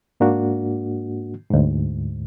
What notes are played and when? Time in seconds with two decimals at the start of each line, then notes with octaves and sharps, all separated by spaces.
0.20 G#2 A#3 D4 F#4
1.50 D2 G#2